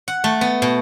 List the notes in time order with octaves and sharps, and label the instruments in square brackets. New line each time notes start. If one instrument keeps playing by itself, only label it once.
[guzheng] F#5
A3
B3
B2